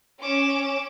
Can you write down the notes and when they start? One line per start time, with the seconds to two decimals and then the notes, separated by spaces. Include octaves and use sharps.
0.22 C#4 D6 E7